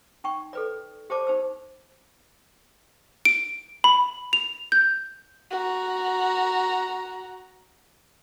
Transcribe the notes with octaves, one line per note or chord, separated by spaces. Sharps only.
D#4 G5 C#6
A4 B4 D5
G4 C5 D5 A5 D6
D#4 C5 E6
D7
B5
F7
G6
F#4 A#5